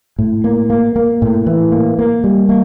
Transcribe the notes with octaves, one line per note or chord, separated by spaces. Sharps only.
A2
A#3
A#3
A#3
A2
E3
A#3
A#3
G3
A#3